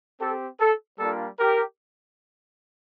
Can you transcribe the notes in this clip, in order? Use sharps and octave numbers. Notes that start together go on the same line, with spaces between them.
C4 G4 A4
A4
G3 A#3 D4 F4 A4
G4 A#4